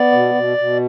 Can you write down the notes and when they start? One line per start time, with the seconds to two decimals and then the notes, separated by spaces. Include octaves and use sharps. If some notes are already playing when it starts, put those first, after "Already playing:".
Already playing: B3 D5
0.12 B2
0.34 B2
0.58 B2